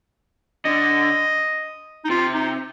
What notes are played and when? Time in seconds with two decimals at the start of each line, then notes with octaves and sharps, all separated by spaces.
0.65 D3 D#5
2.05 D#4
2.09 C3 F4
2.34 D#4